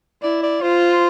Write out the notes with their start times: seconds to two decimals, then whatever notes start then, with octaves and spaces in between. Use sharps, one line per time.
0.23 E4 D5
0.43 D5
0.62 F4 C5